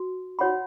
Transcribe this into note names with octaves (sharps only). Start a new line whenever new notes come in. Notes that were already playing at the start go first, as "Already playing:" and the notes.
Already playing: F#4
F#4 C#5 F#5 B5